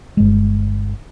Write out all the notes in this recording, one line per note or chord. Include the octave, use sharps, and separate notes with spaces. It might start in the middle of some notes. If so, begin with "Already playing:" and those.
G1 G#3